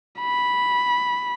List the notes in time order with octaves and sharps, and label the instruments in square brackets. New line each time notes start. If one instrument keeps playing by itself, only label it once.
[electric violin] B5